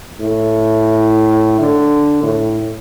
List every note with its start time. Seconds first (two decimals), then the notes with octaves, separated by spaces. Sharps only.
0.20 A2
1.60 D3
2.23 A2